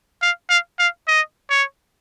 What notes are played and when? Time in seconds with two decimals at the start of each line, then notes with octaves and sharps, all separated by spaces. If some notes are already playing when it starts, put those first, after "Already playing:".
0.22 F5
0.50 F5
0.79 F5
1.08 D#5
1.50 C#5